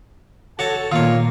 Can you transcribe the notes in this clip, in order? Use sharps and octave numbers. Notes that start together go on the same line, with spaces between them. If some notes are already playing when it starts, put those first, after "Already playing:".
F#4 A4 C#5 A5
A#2 D#3 A#3 F4 C#5